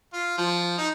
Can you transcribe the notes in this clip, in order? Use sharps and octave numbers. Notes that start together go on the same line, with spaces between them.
F4
F3
D#4